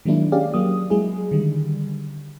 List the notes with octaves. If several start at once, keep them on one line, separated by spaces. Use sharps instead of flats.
D#3 F#3 G#3 A#3 D4 E4
C#4 G4 G#4 D5 F5
F#3 A#3 D#6
F#3 G#3 E4 G#4
D3 D#3 G3